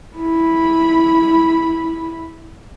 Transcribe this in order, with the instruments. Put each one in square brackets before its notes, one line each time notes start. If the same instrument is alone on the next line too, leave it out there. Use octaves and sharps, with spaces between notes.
[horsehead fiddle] E4 B5